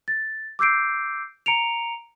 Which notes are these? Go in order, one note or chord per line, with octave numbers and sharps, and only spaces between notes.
A6
D6 E6 G6 C7 D7
A#5 C#7 D7 F7